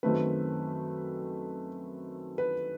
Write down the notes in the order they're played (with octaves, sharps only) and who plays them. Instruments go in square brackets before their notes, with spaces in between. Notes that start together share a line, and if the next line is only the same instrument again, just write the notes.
[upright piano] F#2 D#3 A3 C4 B4
B4